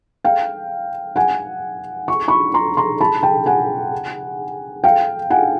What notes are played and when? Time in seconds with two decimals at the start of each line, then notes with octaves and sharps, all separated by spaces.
0.24 F5 G5
1.16 F#5 G#5
2.08 C#6
2.28 B5 C#6
2.54 A#5 C6
2.77 A#5 C6
3.01 A5 B5
3.23 G5 A5
3.46 F#5 G#5
4.84 F5 G5
5.30 F#5 G#5